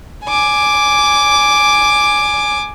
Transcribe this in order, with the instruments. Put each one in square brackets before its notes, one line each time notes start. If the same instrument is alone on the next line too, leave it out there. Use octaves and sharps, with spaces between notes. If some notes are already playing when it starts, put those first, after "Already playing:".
[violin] G#5 D6